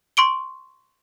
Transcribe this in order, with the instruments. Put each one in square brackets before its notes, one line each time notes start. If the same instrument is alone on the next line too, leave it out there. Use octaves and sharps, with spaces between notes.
[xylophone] C6 C#6 D7 G7